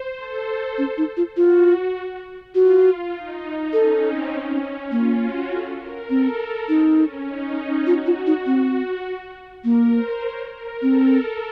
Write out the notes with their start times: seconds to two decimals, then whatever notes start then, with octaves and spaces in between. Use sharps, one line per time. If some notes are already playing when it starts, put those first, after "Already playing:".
Already playing: C5
0.18 A4
0.78 C#4
0.98 D#4
1.17 F4
1.37 F4 F#4
2.55 F4 F#4
2.85 F4
3.14 D#4
3.73 C#4 A4
4.02 C4
4.32 C#4
4.91 A#3 F4
5.21 F#4
5.51 A4
5.80 A#4
6.09 C4 A4
6.69 C4 D#4
6.98 C#4
7.28 D#4
7.87 F4 F#4
8.06 F4
8.27 D#4
8.46 C4
9.64 A#3 A#4
9.94 C5
10.23 C#5
10.53 A#4
10.82 C4 A4